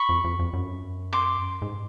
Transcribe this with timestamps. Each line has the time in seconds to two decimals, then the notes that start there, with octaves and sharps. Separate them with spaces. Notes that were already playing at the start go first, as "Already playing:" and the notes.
Already playing: B5 C#6
0.09 F2
0.24 F2
0.39 F2
0.53 F#2
1.13 C6 D6
1.62 G#2